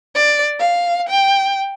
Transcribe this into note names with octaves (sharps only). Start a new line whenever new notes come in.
D5
F5
G5